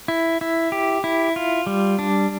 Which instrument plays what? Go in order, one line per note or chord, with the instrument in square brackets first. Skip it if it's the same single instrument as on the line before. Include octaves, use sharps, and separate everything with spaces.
[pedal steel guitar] E4
E4
G4
E4
F4
G3
D4